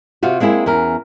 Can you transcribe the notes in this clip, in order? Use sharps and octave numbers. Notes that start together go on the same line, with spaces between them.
C3 F4 F#4
G#3 A#3 C4 E4 G#4
E2 C#4 A#4